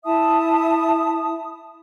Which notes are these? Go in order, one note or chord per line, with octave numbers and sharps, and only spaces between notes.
E4 E5 A5 D#6